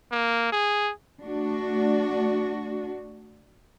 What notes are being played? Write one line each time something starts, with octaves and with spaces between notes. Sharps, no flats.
A#3
G#4
A3 D4 F#4